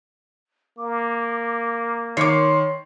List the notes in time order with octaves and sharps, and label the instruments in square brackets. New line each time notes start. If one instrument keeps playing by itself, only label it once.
[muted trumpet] A#3 [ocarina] D6
[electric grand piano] D#3 C7 [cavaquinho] C#5 D6 [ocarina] C6